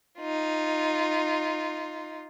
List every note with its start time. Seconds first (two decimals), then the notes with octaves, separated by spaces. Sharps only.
0.18 D#4 F4